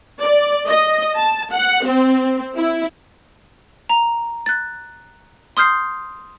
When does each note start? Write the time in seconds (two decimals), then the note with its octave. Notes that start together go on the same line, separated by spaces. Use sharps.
0.22 D5
0.68 D#5
1.16 A5
1.54 F#5
1.85 C4
2.56 E4
3.89 A#5
4.46 F#6 A6
5.57 C6 D#6 F6 G6 C7